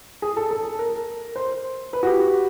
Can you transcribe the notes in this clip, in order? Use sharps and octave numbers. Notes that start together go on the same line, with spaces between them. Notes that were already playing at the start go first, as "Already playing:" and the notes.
G#4
A4
A4
A#4
C5
B4
F#4
G4